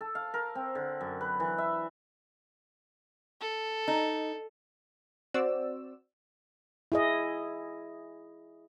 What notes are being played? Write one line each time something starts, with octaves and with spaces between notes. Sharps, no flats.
A4
F5
A#4
C4
D3
F#2
B4
E3
E5
A4
D#4
C4 F#4 C5 D5 E6
E4 G#4 D#5